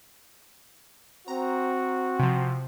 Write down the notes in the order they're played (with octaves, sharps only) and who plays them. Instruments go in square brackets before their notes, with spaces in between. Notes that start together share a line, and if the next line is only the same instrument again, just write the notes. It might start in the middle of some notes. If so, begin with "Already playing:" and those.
[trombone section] C4 F#4 [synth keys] A#5
[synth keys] C3 F3